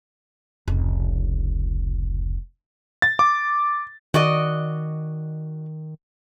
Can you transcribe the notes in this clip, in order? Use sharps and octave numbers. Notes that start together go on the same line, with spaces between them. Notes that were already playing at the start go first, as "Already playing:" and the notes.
F1 C#2
A6
D6
D#3 F#4 D5 D#5